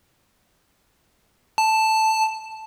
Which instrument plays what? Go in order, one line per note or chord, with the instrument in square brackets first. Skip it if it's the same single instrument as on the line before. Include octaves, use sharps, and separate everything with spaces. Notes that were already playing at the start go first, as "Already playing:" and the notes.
[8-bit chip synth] A5